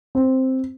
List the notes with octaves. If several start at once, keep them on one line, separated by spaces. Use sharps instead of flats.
C4